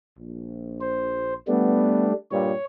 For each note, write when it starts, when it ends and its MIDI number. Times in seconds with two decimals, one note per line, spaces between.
0.19 1.34 34
0.81 1.34 72
1.48 2.13 55
1.48 2.13 57
1.48 2.05 59
1.48 2.13 62
2.31 2.53 43
2.31 2.53 46
2.31 2.53 55
2.31 2.65 73